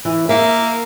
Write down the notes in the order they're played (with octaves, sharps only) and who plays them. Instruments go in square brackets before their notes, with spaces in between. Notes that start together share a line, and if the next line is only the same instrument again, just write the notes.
[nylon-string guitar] E3
[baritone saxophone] A#3 [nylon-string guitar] E5